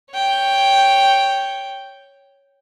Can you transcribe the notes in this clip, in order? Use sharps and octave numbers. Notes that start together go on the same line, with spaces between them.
C#5 G5